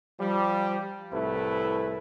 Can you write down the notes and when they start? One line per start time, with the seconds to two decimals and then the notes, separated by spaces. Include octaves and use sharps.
0.20 F3 G3
1.12 C2 A2 A3 E4 B4